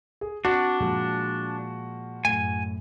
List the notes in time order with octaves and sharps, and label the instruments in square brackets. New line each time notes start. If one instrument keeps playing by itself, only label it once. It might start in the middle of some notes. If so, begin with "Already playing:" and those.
[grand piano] G#4
[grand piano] C4 A6 [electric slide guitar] D4 [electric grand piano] F#4
[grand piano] A#2 F3 G#3
[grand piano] F#2 A2 [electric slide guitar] G#5